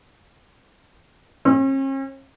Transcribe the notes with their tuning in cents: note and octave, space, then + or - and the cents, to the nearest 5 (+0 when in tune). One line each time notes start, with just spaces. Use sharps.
C#4 -45